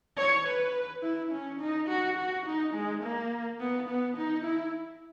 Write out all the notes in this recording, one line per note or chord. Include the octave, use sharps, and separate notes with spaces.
C#5
B4
E4
C#4
D#4
F#4
F#4
D#4
G#3
A#3
B3
B3
D#4
E4